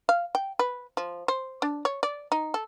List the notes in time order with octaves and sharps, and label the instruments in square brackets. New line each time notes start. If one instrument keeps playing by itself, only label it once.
[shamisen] F5
G5
B4
F3
C5
D4
C#5
D5
D#4
A4